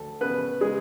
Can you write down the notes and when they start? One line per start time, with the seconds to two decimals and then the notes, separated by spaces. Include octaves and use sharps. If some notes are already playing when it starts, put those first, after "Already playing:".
Already playing: D2 A4
0.21 C#3 B3 B4
0.61 C#3 G#3 G#4